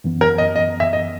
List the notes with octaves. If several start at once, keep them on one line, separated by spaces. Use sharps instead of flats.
F#2 E3 B3
A#4
D#5
D#5
E5
D#5